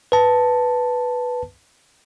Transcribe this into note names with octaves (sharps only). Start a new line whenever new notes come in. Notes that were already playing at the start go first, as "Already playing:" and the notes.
B4 A5